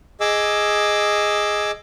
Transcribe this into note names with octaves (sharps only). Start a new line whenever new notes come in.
G#4 D#5 D6 E6